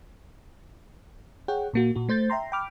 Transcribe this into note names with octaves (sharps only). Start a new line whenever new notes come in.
G#4 C#5 F#5 G5
A#2 A#3 F#4
A#2 F#4
A3 C5 G6 A6
E5 G5 A#5 C6
G5 B5 D6 F6